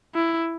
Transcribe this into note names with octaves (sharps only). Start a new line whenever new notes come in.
E4